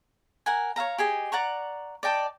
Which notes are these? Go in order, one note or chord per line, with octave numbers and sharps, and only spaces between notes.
A#4 F#5 G#5
C#5 E5 F5 A#5
G4 G#4 D#5
D5 F#5 A#5 C#6
D5 D#5 G5 A5